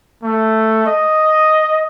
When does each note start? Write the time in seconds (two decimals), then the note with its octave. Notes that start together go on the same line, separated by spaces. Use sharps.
0.23 A3
0.86 D#5